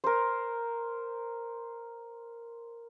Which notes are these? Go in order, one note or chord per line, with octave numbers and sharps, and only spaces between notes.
A#4 C5